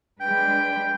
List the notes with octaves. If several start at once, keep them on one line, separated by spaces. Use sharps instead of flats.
G#3 D4 B4 G5